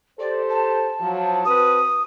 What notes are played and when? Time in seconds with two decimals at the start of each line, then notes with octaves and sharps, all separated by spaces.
0.20 G4 A4 C5 D5
0.49 A5
0.99 F3 F#3
1.45 C4 F#4 B4 D#6